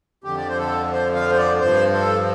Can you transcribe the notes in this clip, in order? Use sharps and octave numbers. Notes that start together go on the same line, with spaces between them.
F2 D3 F3 G4
D5
C5
A4
C5
F5
C5
D5
G2 F3 C5
A4